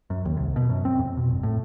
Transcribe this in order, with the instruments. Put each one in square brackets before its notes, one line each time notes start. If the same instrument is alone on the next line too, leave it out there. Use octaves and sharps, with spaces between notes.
[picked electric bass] F#2
D#2
C2
B2
F#2
C4
F2
B2
G1
A2